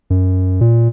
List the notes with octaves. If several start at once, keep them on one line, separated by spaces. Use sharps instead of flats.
F#2
A#2